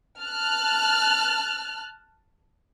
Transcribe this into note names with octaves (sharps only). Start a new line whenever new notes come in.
A5 F6 F#6